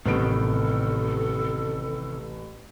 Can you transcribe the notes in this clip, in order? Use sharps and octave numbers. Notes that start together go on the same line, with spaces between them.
A1 A2 C3 D#3 B3 A4 D7